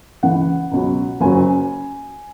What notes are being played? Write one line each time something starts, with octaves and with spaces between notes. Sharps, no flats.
C#2 C#3 E3 F#5
C#2 B2 F#3
F#1 F#2 C#3 F#3 G#5